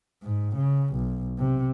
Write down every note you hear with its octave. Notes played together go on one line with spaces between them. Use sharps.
G#2
C#3
B1
C3